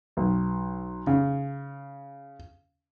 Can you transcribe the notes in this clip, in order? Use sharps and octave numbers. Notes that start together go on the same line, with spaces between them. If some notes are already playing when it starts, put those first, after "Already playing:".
B1
C#3